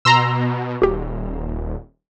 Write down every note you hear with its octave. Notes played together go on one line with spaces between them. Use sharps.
B2 A#5 C6 E6
D#1 F#4 G4